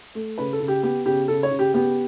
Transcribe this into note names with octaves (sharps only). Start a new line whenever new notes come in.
A3
C#3 B4
A4
C#3
G4
B3 G4
C#3 G4
C#3 A4
C#5
C#3
G4
B3 G4